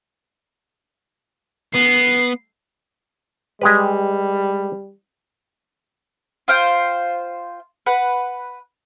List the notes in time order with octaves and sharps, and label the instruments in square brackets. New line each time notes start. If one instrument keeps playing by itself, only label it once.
[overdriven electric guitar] B3 [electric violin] C7
[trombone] G3 [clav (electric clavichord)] G#3 G4 B4
[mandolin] F4 C5 F5 G5
B4 F#5